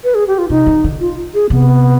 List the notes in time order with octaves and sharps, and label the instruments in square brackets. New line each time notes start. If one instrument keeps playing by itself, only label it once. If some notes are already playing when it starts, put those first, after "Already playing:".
[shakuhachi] B4
G#4
G4
F4
[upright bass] C3 [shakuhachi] D#4
[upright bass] D3
D3
[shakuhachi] F4
G#4
[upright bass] C3 [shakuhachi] B3